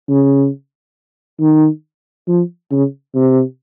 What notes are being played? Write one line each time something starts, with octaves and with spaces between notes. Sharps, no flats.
C#3
D#3
F3
C#3
C3